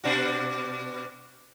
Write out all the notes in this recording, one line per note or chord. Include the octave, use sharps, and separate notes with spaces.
B2 D4 F#4